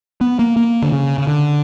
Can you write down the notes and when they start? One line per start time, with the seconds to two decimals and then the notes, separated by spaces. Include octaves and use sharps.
0.21 B3
0.39 A#3
0.56 A#3
0.82 D3
0.92 C#3
1.18 C#3
1.27 D3